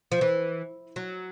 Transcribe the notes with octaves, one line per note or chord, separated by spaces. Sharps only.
F3
E3
F#3